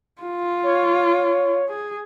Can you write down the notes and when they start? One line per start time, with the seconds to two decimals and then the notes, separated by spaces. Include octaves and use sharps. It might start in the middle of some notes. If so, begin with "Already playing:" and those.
0.22 F4
0.63 C#5
1.69 G#4